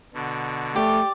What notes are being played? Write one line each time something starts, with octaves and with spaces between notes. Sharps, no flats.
B2 D3
A3 G4 D5